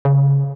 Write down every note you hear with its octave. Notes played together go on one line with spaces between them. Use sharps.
C#3